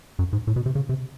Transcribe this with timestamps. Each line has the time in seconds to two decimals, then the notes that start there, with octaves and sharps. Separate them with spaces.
0.19 F#2
0.33 G#2
0.47 A2
0.56 B2
0.66 C3
0.75 C#3
0.89 C3